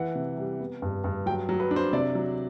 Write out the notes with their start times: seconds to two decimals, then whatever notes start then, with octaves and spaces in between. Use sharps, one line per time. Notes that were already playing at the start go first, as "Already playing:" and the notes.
Already playing: E3 F#5
0.15 C3
0.37 G3
0.60 B3
0.82 G2
1.04 G2
1.26 F#3 G5
1.49 F#3
1.60 B4
1.71 D4
1.76 C5
1.93 C3 D5
2.15 F#3